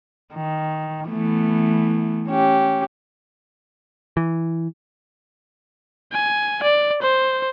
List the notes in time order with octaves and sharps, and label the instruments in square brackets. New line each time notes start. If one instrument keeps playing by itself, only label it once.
[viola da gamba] D#3
E3 A3 B3
C#4 G4
[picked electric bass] E3
[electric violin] G#5
D5
C5